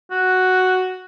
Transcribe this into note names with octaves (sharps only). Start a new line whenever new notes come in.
F#4